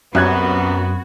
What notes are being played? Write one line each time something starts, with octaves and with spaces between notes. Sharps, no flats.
C2 F#2 B3 C4 F#4 F#6 G#6